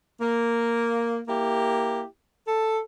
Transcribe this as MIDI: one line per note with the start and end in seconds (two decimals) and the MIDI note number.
0.20 1.19 58
1.27 2.04 58
1.27 2.04 64
1.27 2.04 67
2.47 2.79 69